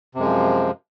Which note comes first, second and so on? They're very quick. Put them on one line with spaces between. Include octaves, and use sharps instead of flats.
C3 F#2 G#3 F3